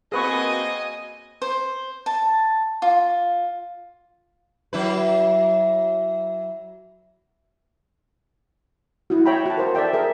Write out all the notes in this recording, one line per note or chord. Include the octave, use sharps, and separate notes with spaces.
A#3 C4 F#4 G#4 B4 D#5 G#5 C#6
C5
A5
F4
F#3 E4 B4
E4 F#4
C#5 E5 G5 A#5 B5
F#4 A5
A#4 C5
A4 D5 E5 G5
G#4 A#4 E5